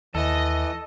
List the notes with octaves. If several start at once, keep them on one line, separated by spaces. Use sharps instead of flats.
D#2 E3 A4 D#5